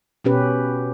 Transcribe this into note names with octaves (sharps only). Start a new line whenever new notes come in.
B2 C#4 G4 B4